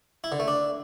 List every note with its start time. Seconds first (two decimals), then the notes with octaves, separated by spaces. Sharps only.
0.24 E4
0.32 D3
0.40 A3
0.48 D4